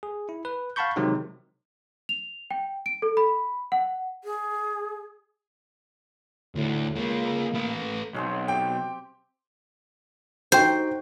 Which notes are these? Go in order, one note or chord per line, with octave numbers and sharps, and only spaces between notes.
G#4
E4
B4
F5 F#5 A5 B5 C#6 G6
C3 D#3 F#3 G#3 C4 D#4
F7
G5
D7
A4
B5
F#5
G#4
D2 A2
G#3 A#3 F4
A3 B4
B1 C4 G#4 C#5
G4 G5 D6
D#4 F#4 C5 G5